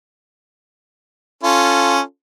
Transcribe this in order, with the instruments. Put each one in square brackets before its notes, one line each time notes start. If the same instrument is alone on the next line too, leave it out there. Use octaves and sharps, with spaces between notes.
[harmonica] C#4 F4 A4